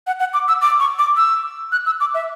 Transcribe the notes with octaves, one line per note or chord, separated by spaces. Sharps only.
F#5
F#5
D6
E6
D6
C#6
D6
E6
F#6
E6
D6
E5